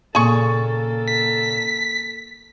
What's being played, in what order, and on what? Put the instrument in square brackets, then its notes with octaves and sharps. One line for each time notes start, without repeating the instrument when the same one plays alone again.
[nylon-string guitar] A#2 C#3 [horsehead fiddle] A#3 A4 [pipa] G#4 C#6
[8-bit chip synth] B6